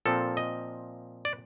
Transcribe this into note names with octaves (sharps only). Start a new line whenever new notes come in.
A#2 F3 C4 A4
D#5
D5